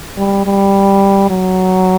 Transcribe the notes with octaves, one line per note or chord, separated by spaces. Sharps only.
G3
G3
F#3